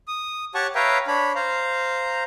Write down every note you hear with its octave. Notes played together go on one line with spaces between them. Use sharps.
D#6
G4 C#5 F#5 A5 C#6
B4 C#5 E5 F5 G5 A#5
D4 C#5 B5
C5 F5 A#5